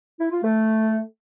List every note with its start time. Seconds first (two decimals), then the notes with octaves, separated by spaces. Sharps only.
0.20 E4
0.31 F4
0.43 A3